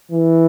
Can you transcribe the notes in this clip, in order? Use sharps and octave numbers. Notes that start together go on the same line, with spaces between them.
E3